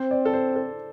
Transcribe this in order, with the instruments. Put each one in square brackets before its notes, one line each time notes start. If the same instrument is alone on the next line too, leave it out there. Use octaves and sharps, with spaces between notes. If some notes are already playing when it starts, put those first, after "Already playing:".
Already playing: [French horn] C4 [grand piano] C5
[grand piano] D5
A4
C5
A4